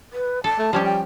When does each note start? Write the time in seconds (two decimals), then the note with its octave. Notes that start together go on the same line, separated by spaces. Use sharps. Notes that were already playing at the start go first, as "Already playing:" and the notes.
0.13 B4
0.44 A4 A5
0.58 A3
0.73 F3 G3 C#4 G4
0.85 G5